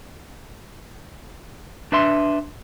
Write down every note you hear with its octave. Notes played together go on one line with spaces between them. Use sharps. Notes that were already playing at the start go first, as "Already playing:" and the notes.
D4 B4 E5 C6